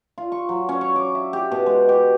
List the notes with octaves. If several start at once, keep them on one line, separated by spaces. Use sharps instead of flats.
F4
C#6
F#3
C#4
C#5
D6
E5
G4
B2
G#3
G4